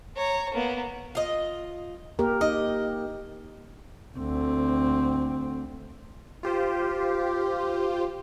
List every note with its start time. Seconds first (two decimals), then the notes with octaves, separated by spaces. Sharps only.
0.16 C#5 A#5
0.54 A#3 B3
1.15 F4 D#5
2.19 A#3 G4 A#4
2.41 D#4 G4 D#5
4.17 D2 C4
6.43 F4 G4 C5